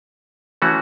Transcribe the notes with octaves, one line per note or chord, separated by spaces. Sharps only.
E3 A3 C#4 F#4